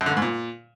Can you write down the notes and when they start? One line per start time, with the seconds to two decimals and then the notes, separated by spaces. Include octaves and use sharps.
0.01 F#2
0.06 D3
0.11 G2
0.17 G#2
0.22 A#2